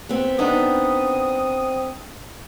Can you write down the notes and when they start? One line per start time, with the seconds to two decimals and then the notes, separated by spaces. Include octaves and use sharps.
0.09 B3 C4
0.39 B3 C4 D4 D#4 A4 D#6